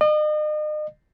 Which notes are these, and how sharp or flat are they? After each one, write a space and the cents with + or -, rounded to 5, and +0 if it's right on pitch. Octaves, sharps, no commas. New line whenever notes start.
D#5 -40